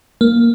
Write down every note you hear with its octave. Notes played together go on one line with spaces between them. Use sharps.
A#3